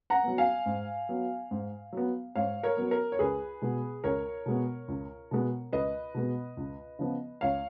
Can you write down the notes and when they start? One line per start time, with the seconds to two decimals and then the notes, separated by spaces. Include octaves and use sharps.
0.10 F#5 A#5
0.24 F#3 B3
0.38 F5 G#5
0.66 G#2
1.09 F#3 B3
1.51 G#2
1.93 F#3 B3
2.35 G#2 C#5 F5
2.63 A#4 C#5
2.77 F#3 B3
2.91 A#4
3.12 C#5
3.19 C#2 G#4 B4
3.62 B2 G#3 B3
4.04 C#2 A#4 C#5
4.46 B2 G#3 B3
4.88 C#2
5.31 B2 G#3 B3
5.72 C#2 B4 D#5
6.14 B2 G#3 B3
6.57 C#2
6.99 C#3 F3 B3
7.41 C#2 C#5 F5